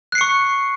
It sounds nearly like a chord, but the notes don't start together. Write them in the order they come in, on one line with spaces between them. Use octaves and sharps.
F#6 C7 C#7 C#6